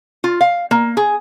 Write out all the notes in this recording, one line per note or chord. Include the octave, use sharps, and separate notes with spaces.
F4
F5
A#3
G#4